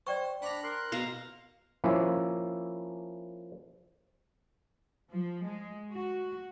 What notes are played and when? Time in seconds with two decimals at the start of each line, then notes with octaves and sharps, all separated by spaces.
0.07 C5 D5 G5 C#6
0.42 D4 F#5 A#5 B5
0.64 A#4 C6 F#6
0.92 B2 F5 A#5
1.84 F3 A#3 C#4 E4
5.10 F3
5.45 G#3
5.91 F#4